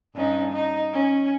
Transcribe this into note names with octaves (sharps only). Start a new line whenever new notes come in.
G2 C#4 D#4
D#4
C#4